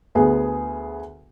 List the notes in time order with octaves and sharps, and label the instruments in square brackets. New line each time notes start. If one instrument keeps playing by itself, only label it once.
[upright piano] D2 B3 G#4